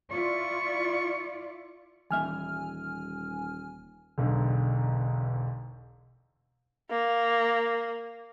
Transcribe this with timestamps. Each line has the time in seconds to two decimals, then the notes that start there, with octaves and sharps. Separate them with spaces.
0.12 E4 F4 D5 C#6
2.11 D#1 E3 G3 E5 G#5 F6
4.18 E1 B1 D3
6.90 A#3